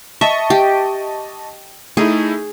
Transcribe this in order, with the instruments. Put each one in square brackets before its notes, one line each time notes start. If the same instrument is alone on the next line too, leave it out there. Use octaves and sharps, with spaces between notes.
[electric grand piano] D#5 A5 C#6 [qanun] E5
[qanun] G4
[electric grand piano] A3 D#4 E4 [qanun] G#4